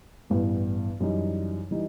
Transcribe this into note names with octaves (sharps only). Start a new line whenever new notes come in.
A1 G2 E3 B3
F#2 E3 G3 D#4
E3 G3 D#4